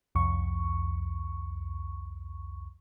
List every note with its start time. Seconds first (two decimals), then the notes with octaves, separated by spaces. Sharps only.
0.15 C2 F2 C#6